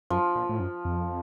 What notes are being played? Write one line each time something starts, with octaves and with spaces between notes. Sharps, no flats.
F#2 F3
A#2
A2
F#2
F2